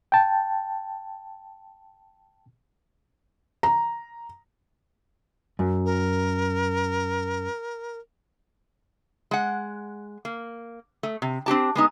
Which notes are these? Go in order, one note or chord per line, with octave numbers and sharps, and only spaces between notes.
G5 A5
A#5
F#2
A#4
G#3 F#5
A#3
A3
C3
C4 D4 G4 A5
G#3 B3 D#4